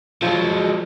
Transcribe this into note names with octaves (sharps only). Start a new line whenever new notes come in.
F3 F#3 G#3